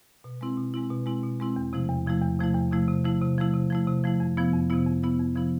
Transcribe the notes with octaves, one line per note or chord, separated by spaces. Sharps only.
B2
G#3 C4 E4
B2
G#3 C4 E4
B2
G#3 C4 E4
B2
G#3 C4 E4
E2
C3 F3 A3 E4
E2
C3 F3 A3 E4
E2
C3 F3 A3 E4
E2
C3 F3 A3 E4
C3
F3 A3 E4
C3
F3 A3 E4
C3
F3 A3 E4
C3
F3 A3 E4
F2
C3 F3 B3 E4
F2
C3 F3 B3 E4
F2
C3 F3 B3 E4
F2
C3 F3 B3 E4